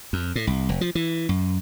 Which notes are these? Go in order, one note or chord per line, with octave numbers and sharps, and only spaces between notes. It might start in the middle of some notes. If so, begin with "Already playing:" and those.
F2
A2
C2
F1
F3
E3
F#2